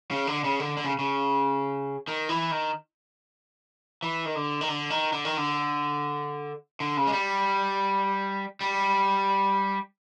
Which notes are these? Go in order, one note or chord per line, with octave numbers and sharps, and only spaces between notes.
C#3
D3
C#3
D3
D3
C#3
C#3
D#3
E3
D#3
E3
D#3
D3
D#3
D3
D#3
D3
D#3
D3
D3
C#3
G#3
G3
G3